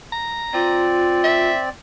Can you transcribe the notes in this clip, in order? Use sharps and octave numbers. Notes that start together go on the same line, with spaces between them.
A#5
C4 F4 D5
E5